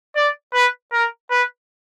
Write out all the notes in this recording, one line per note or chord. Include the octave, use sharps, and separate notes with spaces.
D5
B4
A#4
B4